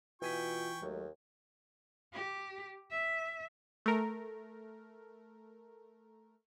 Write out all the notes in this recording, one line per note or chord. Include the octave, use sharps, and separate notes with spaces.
B2 E3 F4 G5 G#5 C#6 B6
D#2 F#3 G#3 A3
G4
E5
A3 A#4